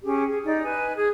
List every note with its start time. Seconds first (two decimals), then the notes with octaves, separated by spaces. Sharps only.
0.03 C#4 G4 G#4
0.28 G#4
0.45 D#4 D5
0.63 B4 G#5
0.96 G#4